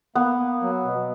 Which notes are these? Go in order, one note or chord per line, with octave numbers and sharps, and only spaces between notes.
A#3 B3
A#3
F#3
B2